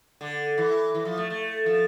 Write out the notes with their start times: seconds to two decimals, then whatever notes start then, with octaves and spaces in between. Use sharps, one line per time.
0.21 D3
0.58 E3
0.94 E3
1.05 F3
1.18 A3
1.30 A3
1.66 F3